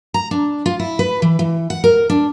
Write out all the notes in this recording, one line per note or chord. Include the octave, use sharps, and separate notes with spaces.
A#5
D4
F4
E4
B4
E3
E3
F#5
A#4
D4